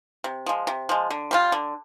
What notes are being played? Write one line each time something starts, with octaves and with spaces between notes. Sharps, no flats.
C3
F3 G#3
C3
F3 G#3
D3
G3 C4 F4
D3